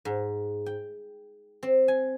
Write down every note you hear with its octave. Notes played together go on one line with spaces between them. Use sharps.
G#2
G5
C4
G#5